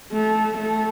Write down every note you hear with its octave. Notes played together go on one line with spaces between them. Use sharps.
A3
A3